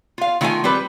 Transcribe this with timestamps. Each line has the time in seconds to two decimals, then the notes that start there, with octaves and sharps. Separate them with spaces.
0.18 F4 F5
0.41 D#3 A3 F4 A#4 G5 G#5
0.64 G3 C4 G4 B4